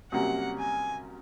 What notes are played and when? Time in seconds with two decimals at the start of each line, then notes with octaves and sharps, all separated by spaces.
0.12 C2 C3 F#3 A#3 C#4 F#5
0.58 G#5